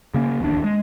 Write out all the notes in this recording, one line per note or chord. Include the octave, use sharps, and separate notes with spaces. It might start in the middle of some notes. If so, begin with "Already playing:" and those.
C#3 A#3 C#4
D1 A1 D#2 D4
G#3